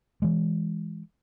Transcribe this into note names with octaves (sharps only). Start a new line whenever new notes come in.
E3 G#3